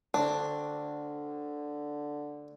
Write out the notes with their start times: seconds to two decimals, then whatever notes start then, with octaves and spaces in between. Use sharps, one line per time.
0.14 D2 D3 C4 D4 D5